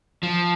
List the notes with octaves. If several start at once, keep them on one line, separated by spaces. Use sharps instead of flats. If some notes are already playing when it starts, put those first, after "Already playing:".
F3